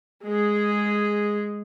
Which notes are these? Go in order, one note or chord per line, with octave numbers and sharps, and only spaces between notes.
G#3 G#4